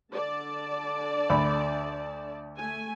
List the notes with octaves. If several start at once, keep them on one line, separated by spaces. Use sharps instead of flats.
D3 D5 A5
D2 B5
A3 G#5